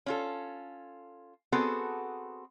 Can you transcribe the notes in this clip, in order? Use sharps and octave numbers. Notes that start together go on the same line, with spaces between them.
C#4 F4 A4
B3 C4 F#4 G#4 A4